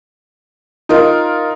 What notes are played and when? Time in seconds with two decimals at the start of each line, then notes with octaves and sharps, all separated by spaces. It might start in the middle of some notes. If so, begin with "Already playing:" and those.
0.89 D#4 F4 A#4